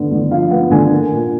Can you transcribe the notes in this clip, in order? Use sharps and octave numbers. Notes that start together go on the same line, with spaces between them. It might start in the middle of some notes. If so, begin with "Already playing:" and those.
Already playing: D3 B3
D3
F3 F5
B3 F#5
D3 G#5
A#3
A#2